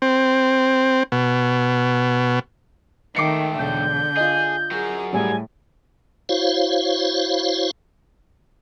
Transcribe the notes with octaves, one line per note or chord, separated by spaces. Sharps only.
C4
B2
G#2 D#3 A3 G5 D6 C7 C#7
E1 D3 G6
F4 G#4 D#5
F#3 G#4 A#4
A2 G3 G#4 G#5
E4 F#4 C5 C#5 F5